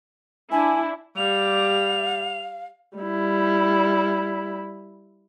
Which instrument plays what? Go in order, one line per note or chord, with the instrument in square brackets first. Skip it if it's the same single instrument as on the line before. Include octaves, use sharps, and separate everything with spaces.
[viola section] D4 E4 [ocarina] G#5
[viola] G3 [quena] F5 [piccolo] F7
[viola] G3 E4